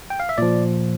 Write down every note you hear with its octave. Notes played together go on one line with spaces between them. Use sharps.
G5
F5
E5
A#2 F3 D5